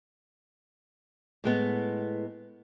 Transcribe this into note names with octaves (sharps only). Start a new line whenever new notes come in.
A2 G#3 B3